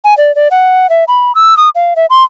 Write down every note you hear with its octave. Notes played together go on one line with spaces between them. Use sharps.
G#5
D5
D5
F#5
E5
B5
E6
D#6
F5
E5
C6